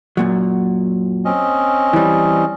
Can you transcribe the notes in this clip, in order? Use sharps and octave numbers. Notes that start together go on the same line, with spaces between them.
F#2 A#2 F#3
C4 C#4 D#5
E3 G3